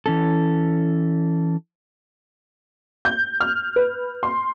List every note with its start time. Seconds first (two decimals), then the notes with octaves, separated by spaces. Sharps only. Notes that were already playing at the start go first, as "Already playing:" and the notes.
0.06 E3 C#4 A4
3.05 G6
3.40 F6
3.76 B4
4.23 C6